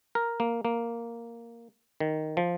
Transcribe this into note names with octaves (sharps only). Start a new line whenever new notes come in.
A#4
A#3
A#3
D#3
F3